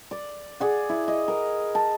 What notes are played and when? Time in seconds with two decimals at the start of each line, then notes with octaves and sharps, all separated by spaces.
0.11 D5
0.60 G#4 D5 F#5
0.89 E4
1.08 D#5
1.28 A#4
1.75 A5